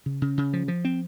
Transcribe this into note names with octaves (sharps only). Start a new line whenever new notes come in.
C#3
C#3
C#3
F3
F3
C4